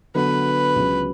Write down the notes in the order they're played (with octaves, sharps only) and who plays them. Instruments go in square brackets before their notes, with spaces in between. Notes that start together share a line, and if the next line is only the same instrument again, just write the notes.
[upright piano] D3 F#3 B3 [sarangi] B4
[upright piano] C#2 C#3 F#3